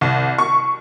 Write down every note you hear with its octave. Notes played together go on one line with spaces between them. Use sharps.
C2
C#6